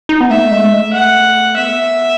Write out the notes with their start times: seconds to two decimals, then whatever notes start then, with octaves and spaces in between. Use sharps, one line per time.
0.09 D#4
0.21 B3
0.30 A3 E5
0.51 G#3
0.73 A3
0.93 F#5
1.57 B3 E5